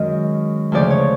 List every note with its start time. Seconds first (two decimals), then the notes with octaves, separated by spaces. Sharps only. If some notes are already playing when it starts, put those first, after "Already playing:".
Already playing: F#2 D#3 G#3 D#5
0.72 D2 C#3 F3 D5
0.90 C#5